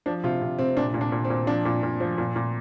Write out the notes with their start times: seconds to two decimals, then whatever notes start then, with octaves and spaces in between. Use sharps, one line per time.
0.06 F3 D4
0.23 C3 F4
0.42 C3
0.59 C3 C4
0.77 A#2 D4
0.94 A#2
1.01 D4
1.12 A#2
1.24 C4
1.30 A#2
1.47 F3 D4
1.65 A#2
1.83 A#2
2.00 F3
2.18 A#2
2.36 A#2